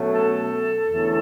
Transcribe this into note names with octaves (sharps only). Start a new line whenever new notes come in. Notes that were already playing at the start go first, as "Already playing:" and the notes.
Already playing: B2 F#3 A3 C#4
A4
E2 D3 A3 C#4